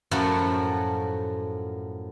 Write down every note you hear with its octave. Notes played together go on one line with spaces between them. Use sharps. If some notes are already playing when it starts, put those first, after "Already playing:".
F#2 A2 F3 A3 F#4